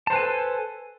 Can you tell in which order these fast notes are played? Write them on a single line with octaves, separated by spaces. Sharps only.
A5 C5 B4 G#5 A4